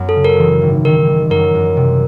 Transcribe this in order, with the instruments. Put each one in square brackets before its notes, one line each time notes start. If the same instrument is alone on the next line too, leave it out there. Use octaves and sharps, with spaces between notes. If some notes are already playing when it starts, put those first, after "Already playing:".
Already playing: [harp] F#2 B3
[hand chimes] A4
[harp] C#3
[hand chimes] A#4
[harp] E3
G#1
[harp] D#3 [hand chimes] A#4
[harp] G3
[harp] F#2 [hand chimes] A#4
[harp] F#2
C3